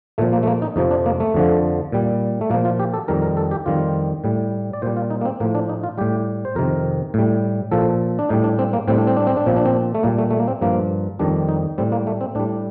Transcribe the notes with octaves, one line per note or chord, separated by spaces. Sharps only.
A#2 F3 A3
A#3
A3
A#3
D#4
F2 C3 F3 D#4
D4
A#3
A3
F2 D3 F3
A#2 G3
A3
A#2 F3 A#3
F4
G4
A4
F2 D#3 G3 A#4
A#4
A4
G4
F2 D#3 G3 F4
A2 G3
D5
A#2 G3 C5
F4
D#4
A#3
C4
A2 F3 A#3
D4
D#4
F4
A2 G3 G4
C5
F2 C3 D#3 A#4
A2 G3
A#2 F3 A4
D4
A2 G3 D#4
D4
C4
A#3
A2 G3 C4
D4
C4
D4
C4
D4
A#2 F3 C4
D4
C4
A3
A#2 G3 A#3
A3
A3
A#3
C4
G2 F3 A#3
F2 D#3 G3 D4
D#4
A2 G3 C4
A#3
A3
C4
A2 G3 D4